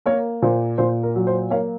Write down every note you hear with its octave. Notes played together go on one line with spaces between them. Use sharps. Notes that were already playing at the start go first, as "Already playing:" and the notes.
A#3 A#4 C#5
A#2 C5
A#2 C5
A#4
F#3
C5
A#3 C#5 F5